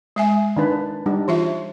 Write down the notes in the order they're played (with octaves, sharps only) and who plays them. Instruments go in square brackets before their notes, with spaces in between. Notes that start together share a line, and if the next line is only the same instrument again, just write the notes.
[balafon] G#3 E5 G#5
[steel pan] D#3 D4 B4
G3 D4 D#4
[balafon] E3 F4 E5